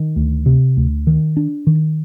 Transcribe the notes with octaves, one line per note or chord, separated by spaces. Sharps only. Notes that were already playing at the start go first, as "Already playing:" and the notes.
Already playing: D#3
D2
C3
D2
D#3
D4
D#3